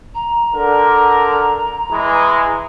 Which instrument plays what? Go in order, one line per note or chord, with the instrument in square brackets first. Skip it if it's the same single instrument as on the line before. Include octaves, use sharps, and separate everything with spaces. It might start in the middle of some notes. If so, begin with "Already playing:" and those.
[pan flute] A#5
[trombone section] D3 A#4
E3 G#3